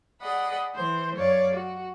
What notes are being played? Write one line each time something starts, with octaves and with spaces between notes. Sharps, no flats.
G#4 D5 D#5 F#5 B5
E3 C5
F#2 C#5 D5 F5
F#4